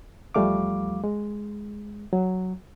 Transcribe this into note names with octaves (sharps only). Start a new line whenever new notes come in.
E2 F3 G3 A3 F5 D6
G#3
F#3